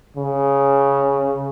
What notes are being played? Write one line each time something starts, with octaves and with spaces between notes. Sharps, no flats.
C#3